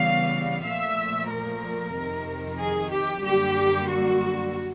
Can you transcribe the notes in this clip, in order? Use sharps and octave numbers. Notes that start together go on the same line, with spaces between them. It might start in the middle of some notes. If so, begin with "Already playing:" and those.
Already playing: C#3 E3 G3 B3 F5
A#2 F3 A3 E5
A#4
F2 C3 D#3
G#4
G4
F#2 D3 G3 A#3 G4
F#4